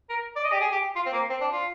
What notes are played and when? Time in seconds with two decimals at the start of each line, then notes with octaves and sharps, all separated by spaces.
0.10 A#4
0.36 D5
0.45 D#5
0.52 G4
0.61 G#4
0.72 G4
0.96 F4
1.06 C4
1.13 A#3
1.30 C4
1.41 D4
1.52 F4